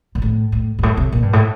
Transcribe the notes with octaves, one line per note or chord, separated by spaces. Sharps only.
A#2
A2
A2
G2
A2
C3
A#2
G2
A2